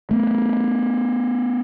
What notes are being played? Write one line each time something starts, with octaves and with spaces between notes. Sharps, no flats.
A3 B3